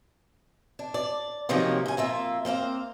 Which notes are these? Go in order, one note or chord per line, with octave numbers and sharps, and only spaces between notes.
D4
D5
C3 D#3 F3 F#3 A#3 C#4
G2 G#5
F2 A#3 F4 E5
A#3 C4 C5 F5